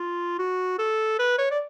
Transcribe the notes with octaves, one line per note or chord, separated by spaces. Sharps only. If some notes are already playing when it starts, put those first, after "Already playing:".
Already playing: F4
F#4
A4
B4
C#5
D5